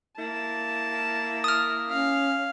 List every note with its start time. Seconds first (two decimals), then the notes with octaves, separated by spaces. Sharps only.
0.18 A#3 E4 A5
1.44 D#6 F6
1.89 C#4 F5